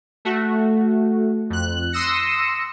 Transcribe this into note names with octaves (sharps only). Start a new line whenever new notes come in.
A3 F#4
F2 F#6
C6 D#6 E6 A#6 C#7